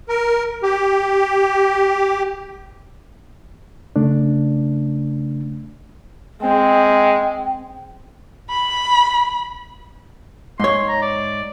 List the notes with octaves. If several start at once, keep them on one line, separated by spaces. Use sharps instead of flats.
A#4
G4
C#3 A3 D4
G#3 C4 G5
B5
G#2 C#5 C6
A#5
D5